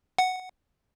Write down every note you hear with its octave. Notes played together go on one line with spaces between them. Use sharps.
F#5